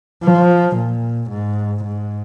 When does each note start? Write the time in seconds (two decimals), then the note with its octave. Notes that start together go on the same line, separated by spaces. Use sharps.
0.24 F3
0.76 A#2
1.30 G#2
1.84 G#2